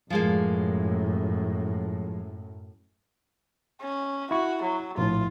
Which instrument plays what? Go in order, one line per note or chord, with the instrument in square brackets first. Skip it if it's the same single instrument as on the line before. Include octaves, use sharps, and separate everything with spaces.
[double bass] F#2 A2 [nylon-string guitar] F3 G#3 A#3
[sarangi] C#4
[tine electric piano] E4 C#6 [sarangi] F#4
[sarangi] F#3
[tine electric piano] A#1 A2 [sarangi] F4